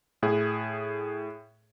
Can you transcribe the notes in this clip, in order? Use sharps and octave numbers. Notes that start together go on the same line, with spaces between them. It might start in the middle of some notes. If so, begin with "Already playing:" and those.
A2 G#4